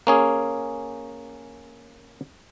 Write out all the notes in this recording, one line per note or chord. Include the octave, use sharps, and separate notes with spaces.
A#3 C#4 G#4